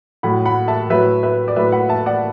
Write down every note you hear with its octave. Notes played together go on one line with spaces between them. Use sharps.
A2 F#3 F#5 B5
F#5 B5
E5 A5
A2 F#3 B4 E5
B4 E5
D5
A2 F#3 B4 E5
F#5 B5
E5 A5
D5 F#5